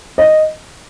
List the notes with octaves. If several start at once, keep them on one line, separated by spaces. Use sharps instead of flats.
D#5